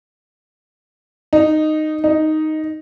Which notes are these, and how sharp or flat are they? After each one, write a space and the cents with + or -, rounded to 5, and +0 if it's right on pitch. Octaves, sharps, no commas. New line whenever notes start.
D#4 -10
D#4 +0